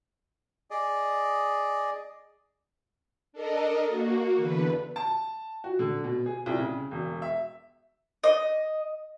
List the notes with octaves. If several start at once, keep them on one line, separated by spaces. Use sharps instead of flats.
G#4 D5 D#5
D4 A4 A#4 D#5
A#3 F#4
E2 D3 B4
A5
F#4
D3
B2
G#4
C2
C#3
E1
E5
D#5